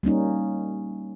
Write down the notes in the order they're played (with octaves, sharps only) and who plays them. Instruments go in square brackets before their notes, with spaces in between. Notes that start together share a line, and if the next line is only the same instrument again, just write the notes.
[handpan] G3 A#3 C#4 D#4